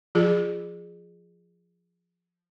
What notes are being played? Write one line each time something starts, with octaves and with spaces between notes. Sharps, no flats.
F3 F4 G#4